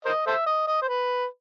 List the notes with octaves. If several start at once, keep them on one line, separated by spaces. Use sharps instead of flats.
A#4 C5 D#5
A4 C5 E5
D#5
D#5
C5
B4